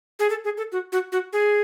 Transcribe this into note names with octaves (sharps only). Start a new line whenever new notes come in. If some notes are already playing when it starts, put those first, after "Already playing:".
G#4
A4
G#4
A4
F#4
F#4
F#4
G#4